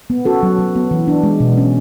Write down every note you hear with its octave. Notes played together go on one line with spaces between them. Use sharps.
B3
C#4 F#4 A4
F#3
F#3
B3
E3
D4
G#3
B2
C#4